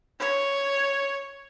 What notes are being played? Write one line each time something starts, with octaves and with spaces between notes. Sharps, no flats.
C#5